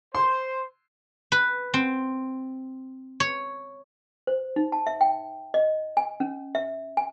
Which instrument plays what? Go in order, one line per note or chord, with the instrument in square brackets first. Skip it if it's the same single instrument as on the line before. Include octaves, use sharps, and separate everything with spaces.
[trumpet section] C5 [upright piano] C6
[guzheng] B4
C4
C#5
[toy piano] C5
D#4
A5
E5
G5
D#5
G#5
C#4
E5
G#5